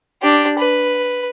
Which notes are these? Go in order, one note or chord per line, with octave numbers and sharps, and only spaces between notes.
D4 G4
B4